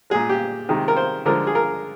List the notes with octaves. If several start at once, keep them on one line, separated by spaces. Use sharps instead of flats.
A#2 G#3 G#4
G4
C3 D#3 G#3
A#4
C5
D3 F3 G#3 A#4
G#4
A#4